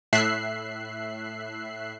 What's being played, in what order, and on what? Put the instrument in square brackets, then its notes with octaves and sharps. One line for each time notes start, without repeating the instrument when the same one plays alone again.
[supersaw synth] A2 E5 F#6 C7